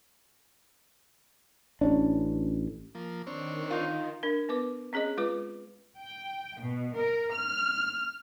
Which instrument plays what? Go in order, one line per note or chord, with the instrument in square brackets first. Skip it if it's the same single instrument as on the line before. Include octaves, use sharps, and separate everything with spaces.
[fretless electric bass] A1 C#4 D4
[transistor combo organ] F3 A#3
[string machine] D#3 [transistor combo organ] C4 D4 C#5
[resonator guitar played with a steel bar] D#4 F4
[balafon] D4 A#4
B3 B4 D6
C4 C#4 G#4 C#5 D#5
G#3 F4 B4 D6
[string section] G5
B2
A#4
F6